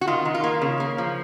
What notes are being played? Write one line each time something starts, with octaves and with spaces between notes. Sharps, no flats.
F#4
D#3 F4
D#3
F4
A#3
C#3
A#3
F3